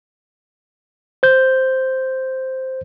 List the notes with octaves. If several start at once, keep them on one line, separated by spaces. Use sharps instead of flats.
C5 G6